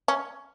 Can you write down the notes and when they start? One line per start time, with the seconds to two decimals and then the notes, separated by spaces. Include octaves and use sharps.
0.08 C#4